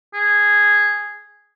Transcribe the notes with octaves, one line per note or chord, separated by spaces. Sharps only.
G#4